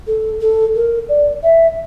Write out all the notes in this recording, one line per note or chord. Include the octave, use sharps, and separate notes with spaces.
A4
A4
A#4
D5
E5